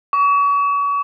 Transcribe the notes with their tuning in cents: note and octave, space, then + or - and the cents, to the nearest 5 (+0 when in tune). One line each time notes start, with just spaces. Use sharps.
C#6 +40